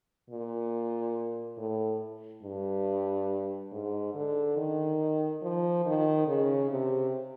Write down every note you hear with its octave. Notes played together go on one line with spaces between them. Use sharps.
A#2
A2
G2
G#2
D3
D#3
F3
D#3
C#3
C3